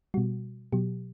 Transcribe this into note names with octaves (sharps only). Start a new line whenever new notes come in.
B2 G3 F#4
B2 F#3 G4